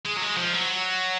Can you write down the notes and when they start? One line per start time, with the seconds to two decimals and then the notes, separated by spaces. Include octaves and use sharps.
0.06 G#3
0.17 F#3
0.22 G#3
0.37 F3
0.53 F#3